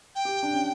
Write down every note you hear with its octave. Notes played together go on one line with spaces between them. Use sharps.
G5
G4
D4
C#4